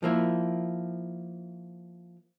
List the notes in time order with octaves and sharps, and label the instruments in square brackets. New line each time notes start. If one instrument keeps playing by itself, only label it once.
[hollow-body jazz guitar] F3 A#3 E4